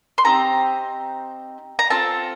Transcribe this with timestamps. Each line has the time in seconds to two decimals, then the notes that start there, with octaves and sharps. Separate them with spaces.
0.18 C6
0.24 C4 D#4 G4 A#5
1.79 A#5
1.90 C4 F4 A4 A5